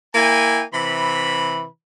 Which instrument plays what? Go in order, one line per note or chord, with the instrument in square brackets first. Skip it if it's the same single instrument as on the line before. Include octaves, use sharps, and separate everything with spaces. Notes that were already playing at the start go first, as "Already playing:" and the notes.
[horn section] A#3 E4 G5 G#5
C3 E3 B5